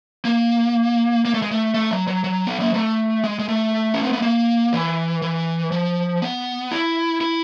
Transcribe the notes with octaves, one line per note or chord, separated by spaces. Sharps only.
A#3
A#3
A3
G#3
A3
A3
F#3
F#3
F#3
B3
A#3
A3
G#3
G#3
A3
C#4
C4
B3
A#3
E3
E3
F3
B3
E4
E4